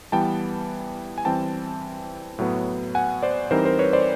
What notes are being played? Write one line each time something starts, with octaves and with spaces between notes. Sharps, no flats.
E3 G3 B3 G5 A5
G#5
E3 G3 C4 G5 A5
A2 F#3 B3
F#5 G#5
C5 D5
E3 G3 C4 D#4 A#4 C5
A#4 C5
B4 C#5
C5 D5